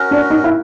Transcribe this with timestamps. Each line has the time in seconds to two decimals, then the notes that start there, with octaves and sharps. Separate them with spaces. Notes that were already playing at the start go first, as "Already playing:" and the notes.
Already playing: C#4 F#4 A#4
0.11 D4
0.30 D#4
0.44 E4